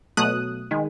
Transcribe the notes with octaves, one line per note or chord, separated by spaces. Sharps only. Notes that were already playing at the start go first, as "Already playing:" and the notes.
B2 F#3 A3 D#6 F#6
D#3 G#3